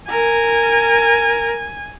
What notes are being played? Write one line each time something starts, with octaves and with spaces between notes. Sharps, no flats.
A#4 G#5